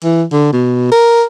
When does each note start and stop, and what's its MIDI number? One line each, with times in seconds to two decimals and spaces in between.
0.04 0.23 52
0.32 0.49 50
0.53 0.89 47
0.92 1.23 70